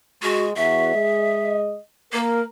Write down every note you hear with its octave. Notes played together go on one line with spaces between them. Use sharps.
G#3 F#4
E2 F#4 E5
G#3 D#5
A#3 A#4